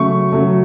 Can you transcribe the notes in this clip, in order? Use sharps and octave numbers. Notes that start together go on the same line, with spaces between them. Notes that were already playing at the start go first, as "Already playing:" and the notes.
Already playing: C#3 F#3 A3 C#6
C#3 F#3 A3